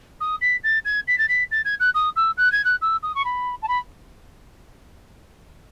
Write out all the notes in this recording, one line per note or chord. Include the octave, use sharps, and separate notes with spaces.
D#6
B6
A6
G#6
B6
A6
B6
A6
G#6
F#6
D#6
E6
F#6
G#6
F#6
E6
D#6
C#6
B5
A5
B5